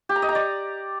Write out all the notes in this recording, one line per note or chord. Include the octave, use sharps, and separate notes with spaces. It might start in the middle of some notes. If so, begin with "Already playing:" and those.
G4
A#5
D#5
A#5
D5